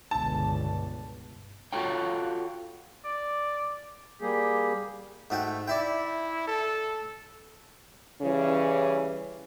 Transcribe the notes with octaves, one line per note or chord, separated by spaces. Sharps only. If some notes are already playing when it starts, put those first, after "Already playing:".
G1 C#2 B2 A5
F4 F#4 A4 C#5 G5
D5
G3 A#3 G4 G#4
G#2 A3 F#4 G5
E4 D5 E5 G5
A4
C#3 E3 G3 C#4